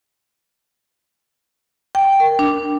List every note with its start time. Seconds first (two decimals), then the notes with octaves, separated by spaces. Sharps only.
1.95 G5
2.20 A#4
2.39 D4